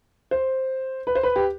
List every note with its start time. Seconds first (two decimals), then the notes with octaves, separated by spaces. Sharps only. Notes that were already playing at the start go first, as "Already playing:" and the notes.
0.31 C5
1.07 B4
1.15 C5
1.23 B4
1.36 G4